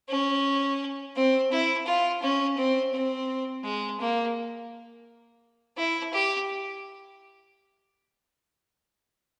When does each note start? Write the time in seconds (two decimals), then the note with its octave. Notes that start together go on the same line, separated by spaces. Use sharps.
0.09 C#4
1.16 C4
1.51 E4
1.86 F4
2.22 C#4
2.57 C4
2.93 C4
3.64 G#3
4.00 A#3
5.77 E4
6.13 G4